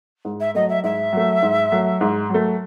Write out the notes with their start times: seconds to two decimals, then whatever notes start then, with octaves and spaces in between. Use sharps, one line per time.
0.25 G#2
0.40 E5
0.54 F#3 A3 D#5
0.69 E5
0.84 G#2 E5
1.13 F#3 A3
1.42 G#2
1.72 F#3 A3
2.01 G#2
2.30 F#3 A3